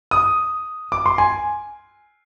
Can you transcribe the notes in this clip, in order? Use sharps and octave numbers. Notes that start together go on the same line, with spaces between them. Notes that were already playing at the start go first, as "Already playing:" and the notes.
D#6
D6
C6
G#5